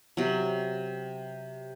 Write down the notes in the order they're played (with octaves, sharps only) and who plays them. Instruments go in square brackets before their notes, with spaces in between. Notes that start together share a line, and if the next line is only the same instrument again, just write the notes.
[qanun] C3 F#3